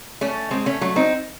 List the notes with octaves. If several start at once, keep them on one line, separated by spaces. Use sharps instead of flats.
A3 C#4
G#3 C4
A3 C#4
F#3 A3
C4 D#4